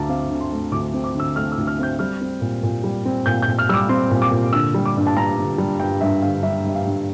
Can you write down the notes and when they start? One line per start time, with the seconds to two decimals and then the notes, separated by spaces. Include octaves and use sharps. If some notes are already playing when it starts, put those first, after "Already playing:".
Already playing: D2 D3 A3 A5 A#5 D6
0.09 C4 F5
0.30 D3
0.40 C6
0.52 A3
0.72 D2 D6
0.94 C4
1.04 D6
1.15 D3 E6
1.36 A3 F6
1.52 E6
1.58 D2
1.67 F6
1.79 C4 G6
1.99 G3 F6
2.21 C4
2.41 A#2
2.63 A#2
2.84 G3
3.05 C4
3.26 A#2 G6
3.42 A#2 G6
3.59 F6
3.69 G3 E6
3.74 D6
3.89 C4 C6
4.11 A#2
4.22 D6
4.31 A#2
4.53 D3 E6
4.74 G3
4.86 D6
4.96 G2
5.07 A5
5.16 G2 A#5
5.38 D3
5.58 G3
5.80 G2 G5
6.01 G2 E5
6.22 D3 F5
6.43 G3 E5
6.65 G2 E5
6.75 F5
6.85 G2